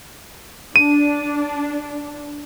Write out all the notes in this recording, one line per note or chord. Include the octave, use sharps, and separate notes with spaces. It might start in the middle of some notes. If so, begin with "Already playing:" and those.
D4 D#7